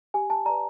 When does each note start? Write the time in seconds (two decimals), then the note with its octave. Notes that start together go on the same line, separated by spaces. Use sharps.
0.14 G4 G#5
0.30 A5
0.46 B4 D5 A#5